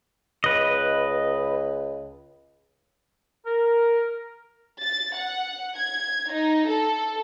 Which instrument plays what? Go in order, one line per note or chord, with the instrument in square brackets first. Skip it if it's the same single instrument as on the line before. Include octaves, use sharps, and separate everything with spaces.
[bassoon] C#2 [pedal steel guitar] B4 D#5
[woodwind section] A#4
[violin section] A6
F#5
G#6
D#4
A4